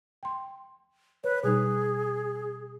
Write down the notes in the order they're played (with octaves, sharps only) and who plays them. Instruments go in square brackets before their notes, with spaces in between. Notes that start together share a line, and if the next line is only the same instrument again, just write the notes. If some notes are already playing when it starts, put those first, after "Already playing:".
[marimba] G5 C6
[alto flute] B4 [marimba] C#5
[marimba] B2 G3 D#4 [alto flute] G#4